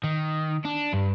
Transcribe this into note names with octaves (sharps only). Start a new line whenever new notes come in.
D#3
D4
G2